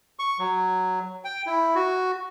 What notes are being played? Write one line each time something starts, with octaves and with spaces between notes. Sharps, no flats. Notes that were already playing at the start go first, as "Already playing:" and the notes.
C#6
F#3
G5
E4
F#4